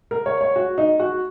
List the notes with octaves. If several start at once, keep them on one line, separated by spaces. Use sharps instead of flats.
A#4
C#5
C#5
F#4
D#4
F#4